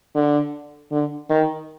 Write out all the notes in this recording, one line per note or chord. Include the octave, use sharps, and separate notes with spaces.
D3
D3
D#3